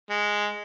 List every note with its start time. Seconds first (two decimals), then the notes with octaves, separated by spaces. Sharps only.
0.10 G#3